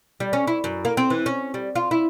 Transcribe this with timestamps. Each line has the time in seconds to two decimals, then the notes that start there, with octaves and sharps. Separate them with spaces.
0.20 G3
0.33 C#4
0.47 E4
0.64 F#2
0.85 A#3
0.97 C4
1.10 E3
1.26 C#4
1.54 G3
1.75 F4
1.91 E4